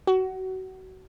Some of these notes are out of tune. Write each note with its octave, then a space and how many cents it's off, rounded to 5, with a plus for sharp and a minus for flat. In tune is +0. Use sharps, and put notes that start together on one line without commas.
F#4 +25